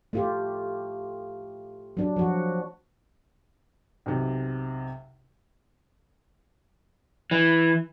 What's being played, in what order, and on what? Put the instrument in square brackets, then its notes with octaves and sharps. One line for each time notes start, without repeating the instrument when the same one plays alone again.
[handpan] A3 F4 G4
F#3 D4
F3 F#4
[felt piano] B1 C3
[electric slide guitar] E3